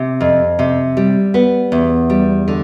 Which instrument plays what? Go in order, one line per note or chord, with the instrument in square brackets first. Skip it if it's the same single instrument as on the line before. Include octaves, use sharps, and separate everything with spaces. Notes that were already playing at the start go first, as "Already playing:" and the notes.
Already playing: [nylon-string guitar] C3
F2
C3
G3
B3
E2
G3
D3